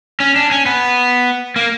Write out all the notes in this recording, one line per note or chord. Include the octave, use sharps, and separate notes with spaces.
C#4
D4
C#4
B3
A#3